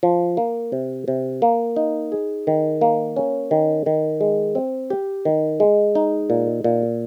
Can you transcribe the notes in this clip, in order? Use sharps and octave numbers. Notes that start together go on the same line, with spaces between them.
F3
A#3
C3
C3
A#3
D#4
G#4
D#3
A#3
C#4
D#3
D#3
G#3
C4
G4
D#3
G#3
D#4
A#2
A#2